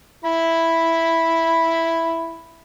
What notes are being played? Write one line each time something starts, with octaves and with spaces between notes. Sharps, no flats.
E4 B5